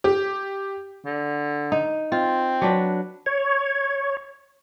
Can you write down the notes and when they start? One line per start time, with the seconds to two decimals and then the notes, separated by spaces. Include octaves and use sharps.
0.04 G4
1.05 D3
1.72 D#4
2.12 C4 F4
2.62 F#3 D4 B4
3.26 C#5